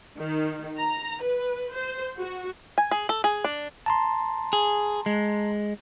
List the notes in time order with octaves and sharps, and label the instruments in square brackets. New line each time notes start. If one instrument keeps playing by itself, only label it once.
[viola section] D#3
A#5
B4
C5
F#4
[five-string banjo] G#5
G#4
A4
G#4
D4
[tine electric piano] A5 A#5 C6
[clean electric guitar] G#4
G#3